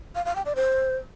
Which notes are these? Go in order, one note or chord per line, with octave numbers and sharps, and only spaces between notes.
F5
F5
G5
D5
C5